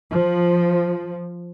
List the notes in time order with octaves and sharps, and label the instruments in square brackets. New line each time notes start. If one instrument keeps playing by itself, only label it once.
[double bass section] F3